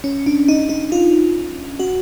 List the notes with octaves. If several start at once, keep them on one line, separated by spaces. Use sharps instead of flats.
C#4
D4
D#4
D#4
F4
F#4